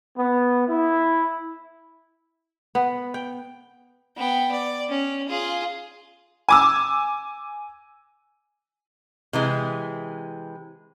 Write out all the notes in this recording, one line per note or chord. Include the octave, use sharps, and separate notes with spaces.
B3
E4
B3
G5
B3 G5
D5
C#4
F4 G#4
G#5 D6 E6
C3 E3 G#3